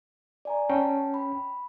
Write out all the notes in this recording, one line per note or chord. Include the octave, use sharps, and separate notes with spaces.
D5 G#5 A#5
C#4 G5 A5
B5